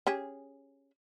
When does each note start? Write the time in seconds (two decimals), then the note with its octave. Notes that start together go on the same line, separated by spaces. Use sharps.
0.07 C#4 G4 G#4